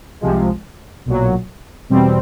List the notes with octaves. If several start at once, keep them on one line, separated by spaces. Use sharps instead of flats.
C2 C3 F3 G#3
B1 A#2 F#3
E2 B2 G3 C4